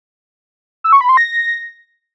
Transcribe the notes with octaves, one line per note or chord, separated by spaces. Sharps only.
E6
C#6
B5
C6
A#6